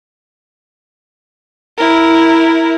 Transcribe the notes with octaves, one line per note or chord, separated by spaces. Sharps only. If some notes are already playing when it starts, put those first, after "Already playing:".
E4 A#4